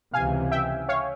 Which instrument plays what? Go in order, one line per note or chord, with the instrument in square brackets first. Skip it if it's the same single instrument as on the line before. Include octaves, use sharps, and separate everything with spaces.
[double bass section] C#2 C3 E3 [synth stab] F5 G#5
[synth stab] E5 G5
C#5 F5